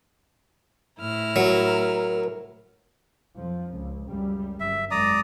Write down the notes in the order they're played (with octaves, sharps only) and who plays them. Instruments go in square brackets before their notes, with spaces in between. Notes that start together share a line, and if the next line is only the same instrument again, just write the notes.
[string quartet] A2 E4 F6
[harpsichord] F#3 [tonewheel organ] A#4
[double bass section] F2 F3
C#2
C#2 F#2 G3
[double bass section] G1 F#2 [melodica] E5
[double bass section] G#1 F#2 G#3 [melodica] D5 A#5 D#6